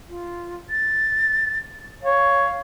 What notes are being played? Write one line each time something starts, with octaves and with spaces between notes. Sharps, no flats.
F4
A6
C#5 F5